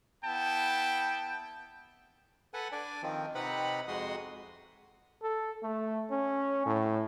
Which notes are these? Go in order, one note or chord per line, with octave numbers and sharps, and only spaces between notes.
B3 E4 G5 A5
A4 B4 F#5 G#5
D4 D5 G#5
D#3 F3 C4
C3 C4 D#4 B4 F#5 B5
F2 G#3 F#4 C6 D#6
A4
A3
C#4
A2